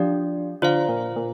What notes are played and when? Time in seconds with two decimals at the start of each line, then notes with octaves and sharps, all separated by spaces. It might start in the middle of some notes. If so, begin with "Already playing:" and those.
Already playing: F3 D4 G4 D5
0.62 D3 F4 C5 F5
0.89 A#2
1.16 A#2